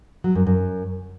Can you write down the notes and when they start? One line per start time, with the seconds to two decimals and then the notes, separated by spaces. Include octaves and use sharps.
0.24 F#3
0.35 F#2
0.47 F#2